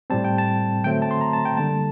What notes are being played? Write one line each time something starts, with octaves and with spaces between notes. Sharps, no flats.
A2 G3 C4 A5
G5
A5
D3 F#3 A3 C4 G5
A5
C6
A#5
A5
G5
D3 G3 A#3 A5